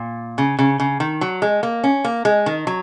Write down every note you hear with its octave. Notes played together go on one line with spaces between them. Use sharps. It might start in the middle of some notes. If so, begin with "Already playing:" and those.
Already playing: A#2
C#3
C#3
C#3
D#3
F#3
G#3
A#3
C#4
A#3
G#3
D#3
F#3